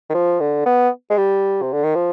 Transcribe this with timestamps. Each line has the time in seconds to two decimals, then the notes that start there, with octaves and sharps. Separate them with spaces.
0.10 D#3
0.15 F3
0.40 D3
0.66 B3
1.10 G#3
1.18 G3
1.62 C3
1.73 D3
1.84 D#3
1.95 F3